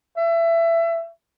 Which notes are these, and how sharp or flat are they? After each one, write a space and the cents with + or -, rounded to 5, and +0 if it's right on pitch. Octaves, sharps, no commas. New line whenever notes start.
E5 +25